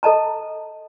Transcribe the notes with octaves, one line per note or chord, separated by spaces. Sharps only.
A4 D#5 A5 A#5